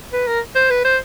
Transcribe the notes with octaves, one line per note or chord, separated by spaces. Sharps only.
B4
A#4
C5
B4
C5